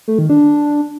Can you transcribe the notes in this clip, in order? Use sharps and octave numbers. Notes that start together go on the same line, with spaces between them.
A3
D#3
D4